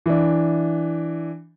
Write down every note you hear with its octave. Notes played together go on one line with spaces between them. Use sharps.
E3 D4